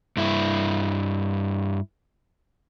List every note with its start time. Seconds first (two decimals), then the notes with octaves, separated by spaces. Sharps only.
0.17 G2 E4